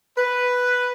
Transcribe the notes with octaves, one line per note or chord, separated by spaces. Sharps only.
B4